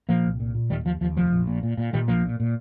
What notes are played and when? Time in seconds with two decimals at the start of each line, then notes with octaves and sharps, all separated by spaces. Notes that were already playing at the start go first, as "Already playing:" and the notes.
0.09 A#2 F3 A#3
0.25 C2
0.40 A#2
0.55 A#2
0.70 D#2 D#3 G3
0.85 D#2 F3
1.01 D#2 F3
1.16 F1 F3
1.32 A#1
1.47 A#2
1.63 A#2
1.78 A#2
1.93 A#2 D#3 G3
2.08 A#1 F3 A#3
2.23 A#2
2.40 A#2